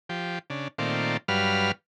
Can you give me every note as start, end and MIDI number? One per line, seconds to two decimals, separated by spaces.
0.09 0.39 53
0.09 0.39 67
0.50 0.68 49
0.50 0.68 62
0.78 1.17 46
0.78 1.17 51
0.78 1.17 57
0.78 1.17 60
0.78 1.17 65
0.78 1.17 74
1.28 1.72 43
1.28 1.72 54
1.28 1.72 55
1.28 1.72 71
1.28 1.72 77
1.28 1.72 89